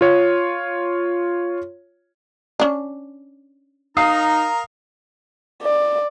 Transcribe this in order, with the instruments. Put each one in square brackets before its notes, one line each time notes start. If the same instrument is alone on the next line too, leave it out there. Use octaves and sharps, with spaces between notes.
[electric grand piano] F4 C#5
[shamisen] C#4 D4
[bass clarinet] D#4 [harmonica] A#4 A#5 [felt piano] F5 D#6 C7
[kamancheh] D5